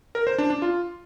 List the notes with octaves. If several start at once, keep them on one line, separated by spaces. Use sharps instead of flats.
A#4
C5
D4
D4
F4